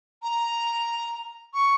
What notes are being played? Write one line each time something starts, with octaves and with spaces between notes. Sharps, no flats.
A#5
C#6